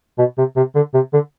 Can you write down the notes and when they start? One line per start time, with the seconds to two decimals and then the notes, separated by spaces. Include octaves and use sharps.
0.19 B2
0.38 C3
0.57 C3
0.75 D3
0.94 C3
1.13 D3